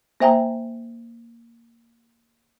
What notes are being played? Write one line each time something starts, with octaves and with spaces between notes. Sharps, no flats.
A#3 C5 E5 G5 G#5 A#5